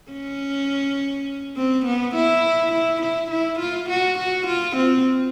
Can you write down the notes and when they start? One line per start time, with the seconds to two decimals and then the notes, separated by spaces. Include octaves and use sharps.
0.11 C#4
1.57 C4
1.86 B3
2.15 E4
2.72 E4
3.01 E4
3.31 E4
3.59 F4
3.89 F#4
4.18 F#4
4.47 F4
4.76 C4